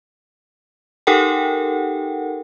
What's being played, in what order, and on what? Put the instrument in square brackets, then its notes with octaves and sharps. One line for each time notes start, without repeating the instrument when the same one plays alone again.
[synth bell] D#4 G4 A4 A#4 F#5 G5